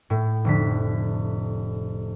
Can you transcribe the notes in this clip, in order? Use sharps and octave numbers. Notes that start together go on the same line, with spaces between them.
A2
F1 D3 B6